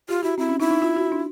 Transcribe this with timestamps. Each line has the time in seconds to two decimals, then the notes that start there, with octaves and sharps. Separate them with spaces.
0.09 F4 G4
0.23 E4 F#4
0.38 C4 E4
0.49 C#4
0.60 D#4 E4
0.70 D#4
0.82 F4
0.96 F#4
1.12 D4